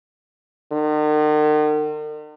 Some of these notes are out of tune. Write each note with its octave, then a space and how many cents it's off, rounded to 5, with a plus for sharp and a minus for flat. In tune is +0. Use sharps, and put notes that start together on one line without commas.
D#3 -45